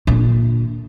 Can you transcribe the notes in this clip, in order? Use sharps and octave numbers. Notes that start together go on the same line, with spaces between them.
A#2 D3